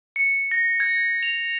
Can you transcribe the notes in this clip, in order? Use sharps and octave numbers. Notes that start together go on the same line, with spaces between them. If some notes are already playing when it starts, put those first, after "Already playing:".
C#7
A#6
G#6
F7